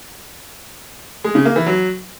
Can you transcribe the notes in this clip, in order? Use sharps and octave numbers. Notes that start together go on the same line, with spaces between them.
G#3
C#3
A#3
E3
F#3